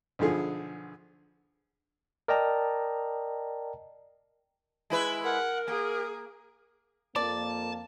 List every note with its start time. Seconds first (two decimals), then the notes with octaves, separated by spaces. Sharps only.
0.19 B1 D3 F3 G#4
2.28 A#4 D5 D#5 G5 A5 A#5
4.90 G#3 E4 B4
5.24 A#4 F#5
5.68 A#3 G#4
7.16 F2 A#3 D5 A5